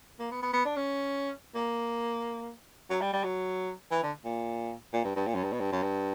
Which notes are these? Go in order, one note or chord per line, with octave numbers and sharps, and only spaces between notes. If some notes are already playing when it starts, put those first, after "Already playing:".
A#3
B3
B3
B3
D4
C#4
A#3
F#3
G3
G3
F#3
E3
D3
A#2
A#2
G2
G2
A#2
F#2
G2
B2
G2
F#2
G2